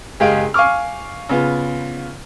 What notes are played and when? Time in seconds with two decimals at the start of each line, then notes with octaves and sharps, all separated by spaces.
0.20 F#1 G#3 G4 G#4 F5 G5
0.54 F5 G#5 C#6 D6 F6
1.29 C#3 B3 F4